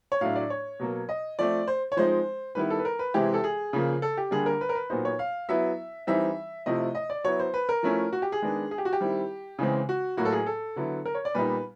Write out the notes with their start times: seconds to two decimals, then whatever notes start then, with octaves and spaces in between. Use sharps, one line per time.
0.12 C#5
0.21 A2 F#3 A3 D4 F5
0.36 D5
0.50 C#5
0.80 B2 F#3 A#3
1.09 D#5
1.39 F3 A3 C4 D5
1.68 C5
1.92 C#5
1.97 F3 G#3 C4 D#4 C5
2.55 D#3 G3 B3 E4 B4
2.70 A4
2.79 B4
2.85 A#4
2.99 B4
3.14 C3 E3 G#3 C4 E4 G4
3.34 A4
3.44 G#4
3.73 C#3 F3 A#3
4.02 A4
4.17 G4
4.31 D3 G3 A#3 D4 G#4
4.46 A#4
4.61 B4
4.69 A#4
4.75 B4
4.90 A#2 F#3 B3 D#4 C5
5.05 C#5
5.19 F5
5.49 F#3 B3 E4 E5
6.07 E3 G3 C4 D#4 E5
6.66 C3 F3 A3 C4 E4 D#5
6.95 D#5
7.10 D5
7.24 F#3 B3 E4 C#5
7.40 C5
7.54 B4
7.69 A#4
7.83 F3 A3 C#4 E4
8.13 F#4
8.22 G4
8.32 G#4
8.42 D#3 G#3 B3 D4
8.71 G#4
8.78 G4
8.85 F#4
8.93 G4
9.00 D#3 G3 C4 E4
9.59 C#3 E3 G#3 C4
9.89 F#4
10.17 A2 F#3 A#3 F#4
10.25 A4
10.33 G#4
10.46 A4
10.76 D3 F#3 B3 E4
11.05 A#4
11.15 C#5
11.25 D5
11.35 A#2 G3 B3 D#4 B4